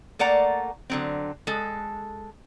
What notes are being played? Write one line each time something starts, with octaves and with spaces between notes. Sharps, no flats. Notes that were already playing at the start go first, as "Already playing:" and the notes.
A3 A#3 D5 F#5 A#5
D3 F#3 C4
G#3 A4